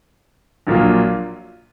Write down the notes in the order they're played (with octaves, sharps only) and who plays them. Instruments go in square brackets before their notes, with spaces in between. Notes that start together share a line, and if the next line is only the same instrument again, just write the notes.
[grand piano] A#1 A#2 F#3 A#3 F4